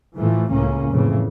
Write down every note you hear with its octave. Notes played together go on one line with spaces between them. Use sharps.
A2 E3 F3 A3
C#2 A2 C#3 A#3 C#4
F2 A2 C#3 E3